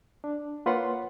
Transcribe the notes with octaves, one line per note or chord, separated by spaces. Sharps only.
D4
A#3 F4 B4 C#5 F#5 C6